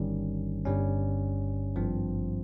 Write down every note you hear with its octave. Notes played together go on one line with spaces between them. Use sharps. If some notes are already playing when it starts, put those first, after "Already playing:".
Already playing: G1 G2 D#3 G3 C#4
G1 G2 G3 C#4
G#1 G2 F3 C4